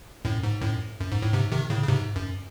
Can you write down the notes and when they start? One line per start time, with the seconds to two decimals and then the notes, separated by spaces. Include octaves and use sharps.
0.25 F#2 A2
0.43 G#2
0.61 F#2 A2
1.00 F#2
1.12 G#2
1.22 A2
1.34 G#2 C3
1.52 C3 D#3
1.70 A2 C#3
1.83 C#3
1.88 G#2 C3
2.16 F#2